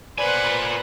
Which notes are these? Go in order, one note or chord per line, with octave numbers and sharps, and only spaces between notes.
A#2 B4 C5 D5 F#5 G#5 B5